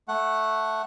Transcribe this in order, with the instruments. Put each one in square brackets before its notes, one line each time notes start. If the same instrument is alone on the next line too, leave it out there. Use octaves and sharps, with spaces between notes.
[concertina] A3 F#5